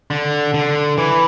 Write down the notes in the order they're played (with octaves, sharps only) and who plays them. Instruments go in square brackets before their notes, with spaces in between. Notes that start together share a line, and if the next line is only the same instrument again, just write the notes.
[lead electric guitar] D3
D3
E3